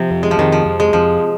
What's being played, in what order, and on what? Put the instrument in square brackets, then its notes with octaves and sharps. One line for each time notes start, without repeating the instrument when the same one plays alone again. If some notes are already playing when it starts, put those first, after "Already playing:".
Already playing: [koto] C3 [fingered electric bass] F3
[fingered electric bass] F2
[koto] G#3
F3
[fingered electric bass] F2 [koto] D#3
[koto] F3
[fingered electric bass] F2
[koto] G#3
[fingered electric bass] F2 [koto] F3